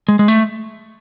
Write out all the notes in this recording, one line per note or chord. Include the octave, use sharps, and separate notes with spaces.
G#3
G#3
A3